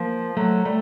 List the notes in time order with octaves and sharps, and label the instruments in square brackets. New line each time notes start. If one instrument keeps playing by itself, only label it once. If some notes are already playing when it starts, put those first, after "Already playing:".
Already playing: [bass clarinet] F3 [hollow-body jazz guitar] A#3
[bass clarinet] F#3 [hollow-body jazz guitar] A3
[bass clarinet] G3 [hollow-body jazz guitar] A3